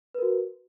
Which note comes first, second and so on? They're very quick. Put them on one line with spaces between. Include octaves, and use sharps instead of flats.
B4 A#4 F#4